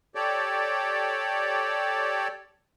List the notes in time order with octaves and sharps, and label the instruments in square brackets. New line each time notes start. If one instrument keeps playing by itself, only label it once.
[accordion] G4 A4 C#5 D5